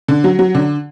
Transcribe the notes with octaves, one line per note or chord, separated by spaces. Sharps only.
D3
F#3
F#3
D3